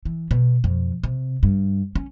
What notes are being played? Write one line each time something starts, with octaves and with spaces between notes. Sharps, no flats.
E3
B2
F2
C3
G2
C#4